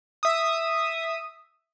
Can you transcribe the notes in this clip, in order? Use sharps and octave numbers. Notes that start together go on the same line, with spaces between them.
E5 D#6